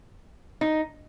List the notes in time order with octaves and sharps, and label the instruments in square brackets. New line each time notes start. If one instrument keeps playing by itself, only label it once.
[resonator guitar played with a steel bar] D#4